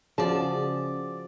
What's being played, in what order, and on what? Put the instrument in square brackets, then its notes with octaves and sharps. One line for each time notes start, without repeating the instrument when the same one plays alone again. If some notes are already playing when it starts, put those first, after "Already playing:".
[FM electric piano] C#3 [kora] F3 [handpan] C#4 F#4 G#4 [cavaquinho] D5 A5